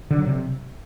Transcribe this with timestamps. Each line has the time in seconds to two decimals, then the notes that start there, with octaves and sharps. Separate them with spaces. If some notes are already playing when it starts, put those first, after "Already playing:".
0.11 D3
0.18 F#3
0.26 C3